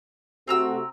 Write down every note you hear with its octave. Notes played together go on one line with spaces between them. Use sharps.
C3 A3 C4 F#4 A#5 E6